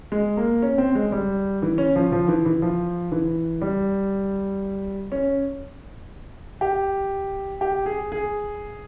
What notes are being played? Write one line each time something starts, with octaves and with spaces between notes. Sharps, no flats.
G#3
A#3
C#4
C4
G#3
G3
E3
C#4
F3
F3
E3
E3
F3
E3
G3
C#4
G4
G4
G#4
G#4